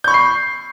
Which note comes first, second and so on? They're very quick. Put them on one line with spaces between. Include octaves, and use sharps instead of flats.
G6 C#6 B5 C7